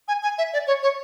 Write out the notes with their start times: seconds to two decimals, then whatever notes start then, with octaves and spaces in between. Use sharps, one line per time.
0.08 G#5
0.23 G#5
0.38 E5
0.53 D5
0.67 C#5
0.83 C#5